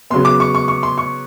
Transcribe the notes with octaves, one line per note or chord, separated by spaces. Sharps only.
C#3 F#3 B3 C6
D6
C#6
C#6
C#6
C6
C#6